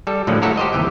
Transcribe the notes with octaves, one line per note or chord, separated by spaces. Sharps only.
G3 A4
A2 D3 F3 F#3 G#3 A#3
F#3 E4 F#4 A4 A#4 F5
G4 C5 D#5
G1 D#2 C3 E3 G5